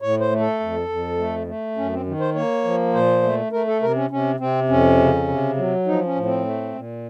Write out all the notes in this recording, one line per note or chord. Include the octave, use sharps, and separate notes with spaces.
A2 C#5
C5
A3
A4
F2
F2
A3
A3
F#2 C#4
C4
D#3
C5
A#3 C#5
F3
A#2 C5
A3
A3 A#4
A4
C3 A#4
C#4
C3 C#4
C3 C4
F2 C#4
C#3
C3
F#3
F3 D#4
C#4
A2
C4
A3
A#2